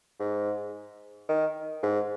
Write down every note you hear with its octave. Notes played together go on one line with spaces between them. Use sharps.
G#2
D#3
G#2